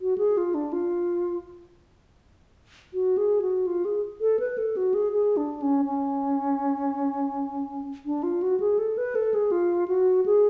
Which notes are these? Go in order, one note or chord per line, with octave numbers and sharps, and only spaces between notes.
F#4
G#4
F4
D4
F4
F#4
G#4
F#4
F4
G#4
A4
B4
A4
F#4
G#4
G#4
D4
C#4
C#4
D4
F4
F#4
G#4
A4
B4
A4
G#4
F4
F#4
G#4